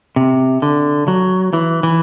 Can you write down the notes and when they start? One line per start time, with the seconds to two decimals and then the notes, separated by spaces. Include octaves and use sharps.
0.16 C3
0.62 D3
1.08 F#3
1.53 E3
1.83 E3